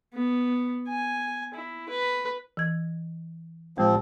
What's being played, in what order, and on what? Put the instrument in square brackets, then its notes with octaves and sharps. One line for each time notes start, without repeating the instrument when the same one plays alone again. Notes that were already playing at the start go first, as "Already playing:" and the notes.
[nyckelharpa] B3
G#5
E4
B4
[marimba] E3 G#6
[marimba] A2 G#3 [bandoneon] F3 C4